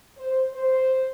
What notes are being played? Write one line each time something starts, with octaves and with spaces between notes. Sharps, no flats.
C5
C5